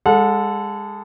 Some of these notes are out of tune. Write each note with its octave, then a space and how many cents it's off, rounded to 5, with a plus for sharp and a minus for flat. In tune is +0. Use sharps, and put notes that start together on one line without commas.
G#3 -25 A4 +0 F#5 -35